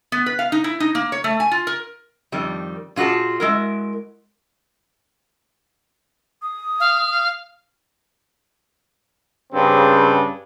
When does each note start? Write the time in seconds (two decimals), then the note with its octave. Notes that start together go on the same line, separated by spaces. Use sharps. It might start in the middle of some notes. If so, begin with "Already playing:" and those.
0.12 B3
0.26 B4
0.39 F5
0.52 D#4
0.64 E4
0.80 D#4
0.95 A#3
1.12 C#5
1.24 A3
1.40 G#5
1.51 F4
1.67 A#4
2.32 F2 D#3 G3
2.96 A#2 F4 F#4 G#4 A5
3.40 G#3 E4 A#4
6.42 D#6
6.80 F5
9.53 G2 C#3 C4